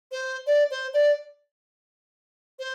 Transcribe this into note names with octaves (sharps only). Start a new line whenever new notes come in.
C5
D5
C5
D5
C5